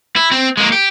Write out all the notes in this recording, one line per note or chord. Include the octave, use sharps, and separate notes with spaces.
E4
C4
G#3 A#3
G4